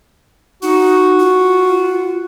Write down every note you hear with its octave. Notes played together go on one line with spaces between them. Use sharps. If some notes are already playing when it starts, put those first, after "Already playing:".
D#4 F#4
F4